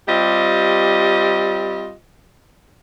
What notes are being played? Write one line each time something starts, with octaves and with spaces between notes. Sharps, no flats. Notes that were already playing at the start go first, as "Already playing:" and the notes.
G3 C4 F4 G4 D#5